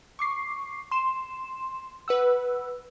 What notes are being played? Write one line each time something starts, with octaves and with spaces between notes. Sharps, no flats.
C#6 D6 C7
C6 E7
B4 F#5 E6